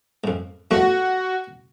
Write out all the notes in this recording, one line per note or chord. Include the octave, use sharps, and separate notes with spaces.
F2 G#2
E2 F3 A3 F#4